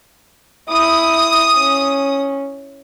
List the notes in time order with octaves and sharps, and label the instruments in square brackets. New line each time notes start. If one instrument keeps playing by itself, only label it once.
[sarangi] E4 [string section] D#6
[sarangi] C#4